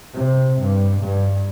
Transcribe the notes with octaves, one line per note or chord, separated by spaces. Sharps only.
C3
G2
G2